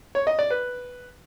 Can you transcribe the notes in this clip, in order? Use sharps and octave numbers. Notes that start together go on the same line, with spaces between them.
C#5
D#5
D5
B4